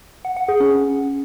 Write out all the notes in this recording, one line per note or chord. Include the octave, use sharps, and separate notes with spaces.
F#5
F#5
G#4
C#4